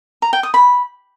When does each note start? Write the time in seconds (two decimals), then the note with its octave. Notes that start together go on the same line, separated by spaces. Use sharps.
0.22 A#5
0.33 G5
0.43 D#6
0.54 B5